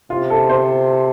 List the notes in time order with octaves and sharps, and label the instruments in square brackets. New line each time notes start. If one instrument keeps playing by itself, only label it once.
[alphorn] C3 [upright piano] F4
[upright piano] A4
C5